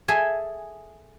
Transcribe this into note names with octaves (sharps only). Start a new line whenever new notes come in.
G#4 A4 E5 G#5